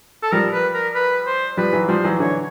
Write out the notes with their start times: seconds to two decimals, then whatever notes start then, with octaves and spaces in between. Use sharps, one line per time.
0.23 A4
0.32 F3 G3 A#4
0.53 B4
0.74 A#4
0.95 B4
1.26 C5
1.57 F3 G3 B4
1.73 E3 F#3
1.88 F3 G3 C5
2.04 E3 F#3
2.19 D3 E3 C#5